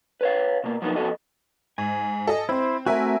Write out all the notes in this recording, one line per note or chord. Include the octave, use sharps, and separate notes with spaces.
B4 C#5 F5
B2 A#3
F3 F#3 A#3 B3 D#4 F4
F2 C3 B3 F#4 A4 D#5
G#2 G#5
A4 D#5
C4 E4 C5
A3 C4 F#4 A#4 E5 G#5